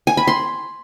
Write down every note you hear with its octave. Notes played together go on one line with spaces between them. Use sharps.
G#5
B5
C6